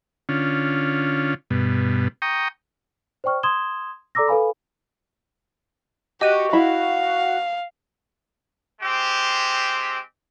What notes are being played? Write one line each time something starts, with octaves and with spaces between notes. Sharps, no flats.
D3 C#4 F4
G2 B2
G5 A#5 C#6 D#6
C5 D5 G5 C#6 F6
C6 D#6 G#6 E7 G7
A4 D5 A#5 D6 E6 A#6
A4 B4 F5 G#5 B5
F#4 G4 D#5 D#7
E4 E5 F5 B5
G#3 C4 G4